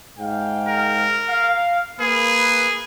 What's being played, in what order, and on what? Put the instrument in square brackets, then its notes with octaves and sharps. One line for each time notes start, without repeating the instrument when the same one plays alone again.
[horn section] G#2 F5 G5
[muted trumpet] A#4
[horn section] F5
[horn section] A#3 B4 [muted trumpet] G#4